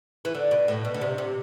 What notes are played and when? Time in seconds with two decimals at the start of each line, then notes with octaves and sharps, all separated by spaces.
0.25 E3
0.35 D3
0.51 B2
0.68 A2
0.85 B2
0.94 D3
1.01 C3
1.18 C3